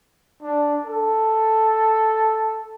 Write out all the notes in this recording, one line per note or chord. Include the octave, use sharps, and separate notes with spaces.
D4
A4